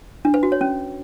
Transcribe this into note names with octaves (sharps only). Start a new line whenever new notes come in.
D4
B4
F#4
C#5
C#4